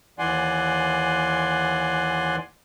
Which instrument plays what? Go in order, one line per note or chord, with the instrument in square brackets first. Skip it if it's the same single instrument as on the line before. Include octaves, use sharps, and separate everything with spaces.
[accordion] D#2 E3 D5 F#5 G#5 C6